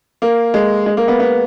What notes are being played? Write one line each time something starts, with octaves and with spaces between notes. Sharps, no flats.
A#3
G#3
G#3
A#3
B3
B3